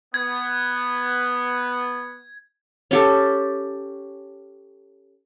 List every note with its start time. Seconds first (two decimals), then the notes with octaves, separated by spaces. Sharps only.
0.14 B3 G#6
2.91 C#4 G4 A4